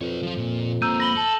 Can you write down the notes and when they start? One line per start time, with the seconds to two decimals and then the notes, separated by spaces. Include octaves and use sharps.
0.01 F2 B4 C#5
0.23 F3 F4
0.37 A#2
0.82 A#3 C4 A#5 E6 G6 D#7
1.00 B5 A#6 F#7 G7
1.16 A4 A5